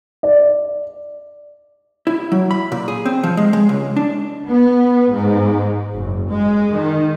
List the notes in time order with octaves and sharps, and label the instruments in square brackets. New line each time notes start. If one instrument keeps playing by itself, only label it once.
[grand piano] D5
[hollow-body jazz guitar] E4
F#3
B5
A#2
G#4
C4
F3
G#3
G#3
C#2
D4
[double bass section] B3
G#2
F#1
G#3
D#3